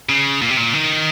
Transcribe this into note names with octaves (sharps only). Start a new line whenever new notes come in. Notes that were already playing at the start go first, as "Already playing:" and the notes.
C#3
A#2
C3
A#2
D#3